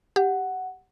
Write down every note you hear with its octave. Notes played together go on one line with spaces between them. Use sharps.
G4 F#5